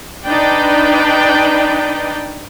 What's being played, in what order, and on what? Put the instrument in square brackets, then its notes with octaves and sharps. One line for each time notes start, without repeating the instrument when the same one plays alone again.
[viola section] D4 D#4 B4 D5 G5